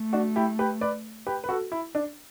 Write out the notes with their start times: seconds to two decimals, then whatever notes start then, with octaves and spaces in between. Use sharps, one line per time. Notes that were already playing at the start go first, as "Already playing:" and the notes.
Already playing: A3
0.13 D4 F#4
0.36 E4 G4
0.59 G4 B4
0.81 B4 D5
1.27 G4 B4
1.44 B4
1.49 F#4 A4
1.72 E4
1.95 D4